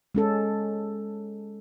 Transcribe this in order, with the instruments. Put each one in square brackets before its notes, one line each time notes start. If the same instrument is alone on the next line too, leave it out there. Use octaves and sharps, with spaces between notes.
[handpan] G#3 C#4 A4